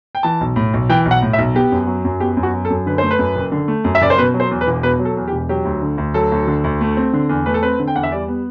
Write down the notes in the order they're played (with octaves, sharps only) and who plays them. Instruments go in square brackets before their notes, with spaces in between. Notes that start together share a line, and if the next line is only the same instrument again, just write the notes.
[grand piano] G5
E3 A5
B1
A2
B1
E3 G5
B1
F#5
A2
E5
B1
B3 G4
F#2
F#3
F#2
B3 G4
F#2
F#4
F#3
A4
F#2
D3 B4
A3 C5
B4
F#2
F#1
D3
A3
F#2
E5
F#1 D5
C5
B2 B4
F#3
C5
E2
B4
E1
B2 B4
F#3
A4
E2
G4
E1
F#3 G4
D2
D3
D2
F#3 A4
D2
D3
D2
A3
C4
D3
E2
A3 B4
A4
C4 B4
D3
G5
E2 F#5
E5
G3 D5
B3